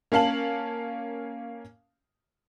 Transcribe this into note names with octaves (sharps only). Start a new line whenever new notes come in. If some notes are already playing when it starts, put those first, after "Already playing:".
A#3 C#4 F5 A5 F#7